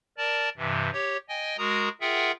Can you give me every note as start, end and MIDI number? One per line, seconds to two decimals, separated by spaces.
0.18 0.49 70
0.18 0.49 74
0.18 0.49 81
0.57 0.90 43
0.57 0.90 48
0.57 0.90 52
0.93 1.17 67
0.93 1.17 73
1.29 1.57 75
1.29 1.57 79
1.29 1.57 80
1.58 1.89 56
1.58 1.89 66
1.58 1.89 70
1.58 1.89 82
1.58 1.89 87
2.01 2.32 65
2.01 2.32 68
2.01 2.32 70
2.01 2.32 76
2.01 2.32 78
2.01 2.32 79